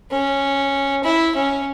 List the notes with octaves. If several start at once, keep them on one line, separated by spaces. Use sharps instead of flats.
C#4
E4
C#4